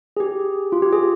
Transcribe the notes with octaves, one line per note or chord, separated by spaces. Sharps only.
G#4
G4
F4
G4
G#4